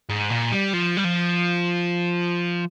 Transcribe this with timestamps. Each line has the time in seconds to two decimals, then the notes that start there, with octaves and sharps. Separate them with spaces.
0.10 G#2
0.30 A#2
0.52 G3
0.73 F3
0.97 G3
1.05 F3